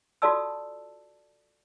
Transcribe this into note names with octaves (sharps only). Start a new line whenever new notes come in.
F4 F#4 A4 D5 A5 E6